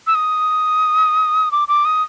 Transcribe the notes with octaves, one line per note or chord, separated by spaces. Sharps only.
E6
D#6
D6
D6
D#6